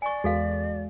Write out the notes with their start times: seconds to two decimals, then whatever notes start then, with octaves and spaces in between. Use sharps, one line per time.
0.02 D5 G#5 C#6
0.24 E2 G#3 F#4 A4 F5